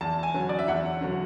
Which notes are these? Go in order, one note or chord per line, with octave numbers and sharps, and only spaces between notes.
E2 A5
G#5
D3 F#3 C#4
D5
E5
E2 F#5
D3 F#3 C#4